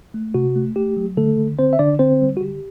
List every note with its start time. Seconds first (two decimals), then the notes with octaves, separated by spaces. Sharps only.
0.14 A3
0.34 C3 F#4
0.56 A3
0.76 A3 G4
0.97 F#3
1.17 D3 A3 A4
1.37 D3
1.59 D3 C4 C5
1.73 E5
1.79 D3 D4 D5
1.99 D3 C4 C5
2.21 G3
2.37 F#4
2.41 D3 G4